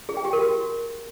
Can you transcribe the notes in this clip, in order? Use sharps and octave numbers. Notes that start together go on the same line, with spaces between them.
G#4
G5
G4
A#4
F#4